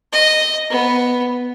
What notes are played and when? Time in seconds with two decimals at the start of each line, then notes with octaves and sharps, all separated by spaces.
0.13 D#5
0.70 B3